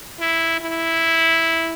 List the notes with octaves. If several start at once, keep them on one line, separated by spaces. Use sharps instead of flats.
E4
E4